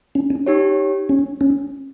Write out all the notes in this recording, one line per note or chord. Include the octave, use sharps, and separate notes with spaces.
C#4
C#4
D#4 G4 C#5
C#4
C#4